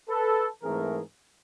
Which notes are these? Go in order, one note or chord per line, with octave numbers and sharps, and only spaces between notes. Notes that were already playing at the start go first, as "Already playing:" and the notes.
A4 B4
G#2 E3 A3 C4 G#4 A#4